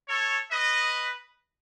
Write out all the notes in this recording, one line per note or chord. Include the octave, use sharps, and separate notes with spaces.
A4 C#5
B4 D#5